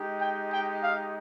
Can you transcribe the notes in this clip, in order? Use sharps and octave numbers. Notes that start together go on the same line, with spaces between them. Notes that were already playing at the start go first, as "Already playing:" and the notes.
Already playing: G#3 D#4 G4
G5
G5
F5